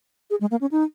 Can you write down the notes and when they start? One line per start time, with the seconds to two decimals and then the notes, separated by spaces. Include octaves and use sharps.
0.30 G#4
0.41 G#3
0.51 A#3
0.61 C#4
0.72 D#4